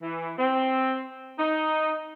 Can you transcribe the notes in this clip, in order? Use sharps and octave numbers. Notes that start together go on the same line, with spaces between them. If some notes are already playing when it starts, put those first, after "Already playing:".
E3
C4
D#4